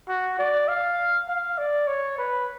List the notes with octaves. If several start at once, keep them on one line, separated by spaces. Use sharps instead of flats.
F#4
D5
F5
F5
D5
C#5
B4